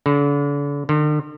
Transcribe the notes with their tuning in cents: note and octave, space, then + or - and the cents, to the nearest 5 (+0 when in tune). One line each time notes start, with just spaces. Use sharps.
D3 -40
D3 +45